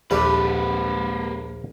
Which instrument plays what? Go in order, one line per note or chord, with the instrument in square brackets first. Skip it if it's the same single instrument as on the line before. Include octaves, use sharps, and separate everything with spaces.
[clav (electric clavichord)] A#1 D4 A4 [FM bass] D#2 [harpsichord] G3 [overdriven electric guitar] A#3 B4